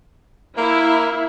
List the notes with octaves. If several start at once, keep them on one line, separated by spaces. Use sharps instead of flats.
A#3 E4